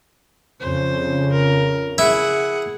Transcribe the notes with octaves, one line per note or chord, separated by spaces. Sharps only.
F2 C#3 C5
A#4
E4 G#4 F#5